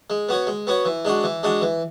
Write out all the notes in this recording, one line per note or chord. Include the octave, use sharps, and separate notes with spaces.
G#3
B3 F#4 C#5
G#3
B3 F#4 C#5
E3
G#3 D4 F#4
E3
G#3 D4 F#4
E3